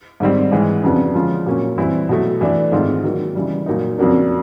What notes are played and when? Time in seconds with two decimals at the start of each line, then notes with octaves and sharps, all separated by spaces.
0.20 G#2 D#3 G3 C4
0.52 G#2 E3 G#3
0.83 F2 C#3 F#3 B3 D4
1.15 D3 F3 G#3 C#4 F4
1.46 A#2 F#3 A#3 C#4
1.78 E3 G3 C4 E4
2.09 B2 F#3 A3
2.41 E3 A3 D4
2.72 G#2 D#3 G#3 C4 F4
3.04 D#3 F#3 A#3
3.35 C#3 E3 G3
3.66 A#2 F#3 A#3 D#4
3.98 F2 C#3 F#3 A#3 D4